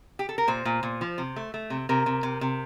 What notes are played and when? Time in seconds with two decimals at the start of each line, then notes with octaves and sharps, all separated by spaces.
0.19 G4
0.29 A4
0.38 A#4
0.48 A#2 C5
0.65 A#2
0.83 A#2
1.01 F3
1.18 C3
1.36 A3
1.54 A3
1.70 C3
1.89 C3 A#4
2.06 C3
2.23 C3
2.41 C3